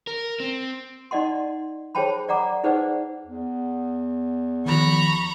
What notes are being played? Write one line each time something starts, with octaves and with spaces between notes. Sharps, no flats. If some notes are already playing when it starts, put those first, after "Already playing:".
A#4
C4
D#4 D5 D#5 F#5 C6
G#4 C5 C#5 G5 A5 B5
D5 F#5 A#5 D6
D#4 G#4 B4 C5 D5 F#5
E2
D#3 F3 A#5 B5 C#6